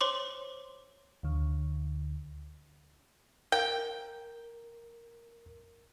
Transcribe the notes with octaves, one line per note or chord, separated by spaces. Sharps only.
C5 C#5 C6 D6
D2 D3
A#4 G5